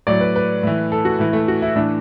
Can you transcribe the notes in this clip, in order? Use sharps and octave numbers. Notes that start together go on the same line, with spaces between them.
A2 F#3 D5
B4
B4
A2 E3
A4
F#4
A2 E3
A3
F#4
E4
A2 E3 D4